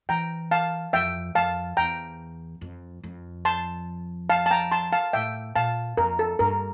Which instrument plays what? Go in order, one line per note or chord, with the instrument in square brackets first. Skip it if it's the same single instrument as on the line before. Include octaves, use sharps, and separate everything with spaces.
[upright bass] E3 [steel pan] G5 A#5
[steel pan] F5 A5
[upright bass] F2 [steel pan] E5 G5
[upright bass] F2 [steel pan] F5 A5
[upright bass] E2 [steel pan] G5 A#5
[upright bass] F2
F2
[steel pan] A5 C6
F5 A5
A5
G5 A#5
A5 C6
F5 A5
[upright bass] A2 [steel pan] E5 G5
[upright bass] A#2 [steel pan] F5 A5
[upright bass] F2 [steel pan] A#4
[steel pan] A4
[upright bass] G2 [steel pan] A#4